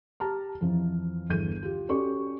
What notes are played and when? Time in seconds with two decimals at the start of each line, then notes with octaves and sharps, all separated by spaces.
0.20 G4 A5 A#5 F6
0.61 F2 E3 F3
1.29 G1 E2 A4 G6 D#7
1.63 F4 G4
1.89 C#4 F#4 G4 A4 D5 C#6